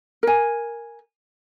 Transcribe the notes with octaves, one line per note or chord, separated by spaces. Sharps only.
A#4 G#5